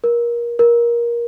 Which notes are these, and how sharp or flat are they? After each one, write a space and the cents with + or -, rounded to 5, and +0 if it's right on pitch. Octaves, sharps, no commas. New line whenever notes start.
A#4 +25
A#4 +20